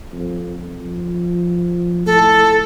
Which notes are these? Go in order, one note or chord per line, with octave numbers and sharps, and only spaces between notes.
F2
F3
A2 A4